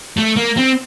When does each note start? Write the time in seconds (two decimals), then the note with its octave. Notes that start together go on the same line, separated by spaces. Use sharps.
0.17 A3
0.36 A#3
0.57 C4